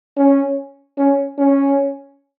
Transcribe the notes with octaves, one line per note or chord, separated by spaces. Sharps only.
C#4
C#4
C#4